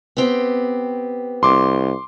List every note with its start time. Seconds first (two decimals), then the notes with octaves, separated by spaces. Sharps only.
0.17 B3 C4 G4
1.43 C2 C6 D6